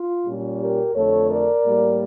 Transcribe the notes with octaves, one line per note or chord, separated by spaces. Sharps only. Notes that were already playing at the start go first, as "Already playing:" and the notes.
Already playing: F4
A#2 G3 C#4
G4 A#4
F2 D3 A3 A4 C#5
A#4 D5
A2 G3 A#3